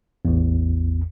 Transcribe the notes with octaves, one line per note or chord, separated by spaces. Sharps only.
A1 E2